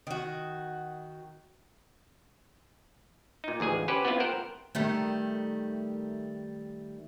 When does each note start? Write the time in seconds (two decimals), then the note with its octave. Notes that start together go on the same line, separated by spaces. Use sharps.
0.07 D#3 F#4
3.44 A#2 D#4
3.60 A1 D2 G#4 G#5
3.88 C#4 G4 B4 C5 F#5
4.05 B3 C4 E4 F4
4.20 A#4 C5 F#5 G5
4.75 D#3 G3 A3